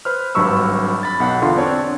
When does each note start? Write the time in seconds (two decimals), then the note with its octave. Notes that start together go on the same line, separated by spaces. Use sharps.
0.05 B4 C5 F6
0.35 G#1 G2 F#3 B5 C#6 E6
1.03 B5 A6
1.20 B1 B2 F#5
1.41 E2 D3 F4 C6
1.57 C4 D4 C#5